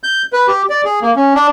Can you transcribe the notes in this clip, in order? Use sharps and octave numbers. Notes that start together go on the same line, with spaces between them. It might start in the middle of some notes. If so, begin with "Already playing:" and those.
G6
B4
G4
D5
G#4
A#3
C#4
D4